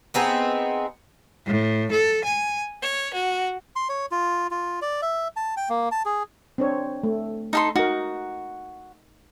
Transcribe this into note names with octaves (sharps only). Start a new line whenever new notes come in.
B3 C4 D#4 G#4
A2
A4
G#5
C#5
F#4
C6
C#5
F4
F4
D5
E5
A5
G5
A#3
A5
G#4
C4 D4 C#5
A3
D#4 A4 C6
D#4 F#4 A#4